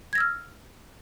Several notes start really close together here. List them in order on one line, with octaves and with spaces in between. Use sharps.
G#6 A#6 E6 F6